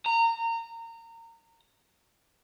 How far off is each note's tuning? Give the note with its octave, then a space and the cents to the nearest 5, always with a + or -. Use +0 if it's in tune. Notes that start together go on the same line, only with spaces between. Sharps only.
A#5 -25